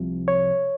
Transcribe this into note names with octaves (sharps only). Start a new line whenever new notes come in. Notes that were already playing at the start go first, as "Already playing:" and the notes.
Already playing: C2 C3 F3
C#5